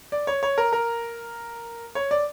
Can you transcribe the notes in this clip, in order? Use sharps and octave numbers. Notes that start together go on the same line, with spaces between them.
D5
C#5
C#5
A#4
A#4
C#5
D5